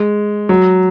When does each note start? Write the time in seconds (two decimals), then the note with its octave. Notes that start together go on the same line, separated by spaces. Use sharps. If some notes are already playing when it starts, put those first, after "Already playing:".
Already playing: G#3
0.49 F#3